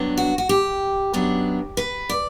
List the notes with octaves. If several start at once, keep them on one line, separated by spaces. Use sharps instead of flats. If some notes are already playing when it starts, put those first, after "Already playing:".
Already playing: G2 F#3 B3 D4
F#4
F#4
G4
F#2 F#3 B3 D4
B4
D5